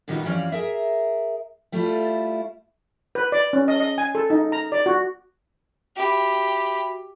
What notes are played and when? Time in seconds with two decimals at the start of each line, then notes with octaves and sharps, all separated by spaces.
0.08 A#2 D#3 G3 B3 D#4 F#4
0.24 F2 E3 G3 C#4 D5 F5
0.52 G#4 A#4 E5
1.72 G3 A3 E4 F4
3.15 B4
3.32 D5
3.53 C#4
3.68 D#5
3.80 D#5
3.98 G#5
4.15 A4
4.30 D#4
4.52 A#5
4.72 D5
4.86 F#4
5.97 F#4 G4 E5 B5